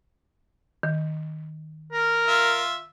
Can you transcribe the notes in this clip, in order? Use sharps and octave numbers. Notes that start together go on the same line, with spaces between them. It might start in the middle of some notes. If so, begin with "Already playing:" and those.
D#3
A#4
F4 E5